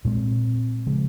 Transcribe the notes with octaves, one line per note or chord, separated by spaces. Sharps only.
A#2 G#3 C4
C#3 F3 G#3